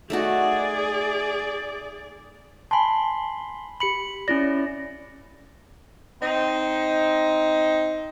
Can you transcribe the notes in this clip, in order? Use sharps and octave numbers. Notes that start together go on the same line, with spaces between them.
A3 D#4 F#4 G#4 D5
G#5 A5 B5 C6
G4 B5 C#7 F#7
C#4 E4 D5 A#6
C4 D#4